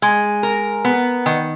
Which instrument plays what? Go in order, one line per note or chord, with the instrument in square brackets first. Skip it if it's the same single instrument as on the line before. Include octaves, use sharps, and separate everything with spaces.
[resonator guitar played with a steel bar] G#3
A#4
B3
D#3